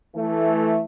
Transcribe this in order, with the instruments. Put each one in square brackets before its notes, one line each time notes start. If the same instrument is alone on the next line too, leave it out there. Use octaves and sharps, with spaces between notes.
[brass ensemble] E3 A3